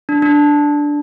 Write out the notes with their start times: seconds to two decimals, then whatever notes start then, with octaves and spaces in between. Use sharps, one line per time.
0.09 D4
0.22 D4